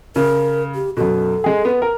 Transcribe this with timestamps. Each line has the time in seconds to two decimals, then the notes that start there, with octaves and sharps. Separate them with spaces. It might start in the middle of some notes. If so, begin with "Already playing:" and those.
0.16 C#3 A#4
0.75 G4
0.97 F#2 B2 A4
1.44 G#3 G#4
1.65 B3
1.82 A#4